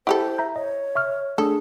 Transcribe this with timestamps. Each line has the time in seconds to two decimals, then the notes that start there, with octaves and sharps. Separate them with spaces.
0.07 E4 G4 A4 C5 F#5
0.38 E5 A#5 G6
0.56 C#5 D#5
0.95 E5 C#6 F6
1.38 A3 D4 G#4 A4 D#6